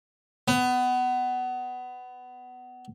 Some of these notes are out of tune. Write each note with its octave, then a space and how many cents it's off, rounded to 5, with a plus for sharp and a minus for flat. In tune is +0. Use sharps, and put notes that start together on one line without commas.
B3 +20